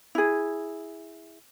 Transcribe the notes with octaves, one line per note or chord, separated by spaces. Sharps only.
E4 G#4